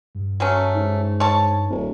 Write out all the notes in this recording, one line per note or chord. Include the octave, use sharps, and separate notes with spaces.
G2
F#3 A3 C#4
G#2
C#5 A5
D1